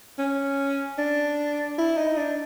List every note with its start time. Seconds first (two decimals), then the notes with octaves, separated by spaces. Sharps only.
0.19 C#4
0.98 D4
1.78 E4
1.97 D#4
2.17 D4